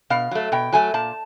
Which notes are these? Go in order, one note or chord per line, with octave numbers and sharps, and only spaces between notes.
B2 F5
F#3 A3
B2 G5
F#3 A3 G#5
A#2 A5